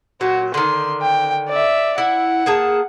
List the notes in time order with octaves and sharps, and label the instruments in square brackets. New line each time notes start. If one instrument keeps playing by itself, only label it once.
[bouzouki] A#2 F#3 [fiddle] F#4
[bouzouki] D3 D#3 [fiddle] C6
[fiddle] G5
D5 E5
[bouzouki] E4 [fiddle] F#5
[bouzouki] A#3 G#4 A5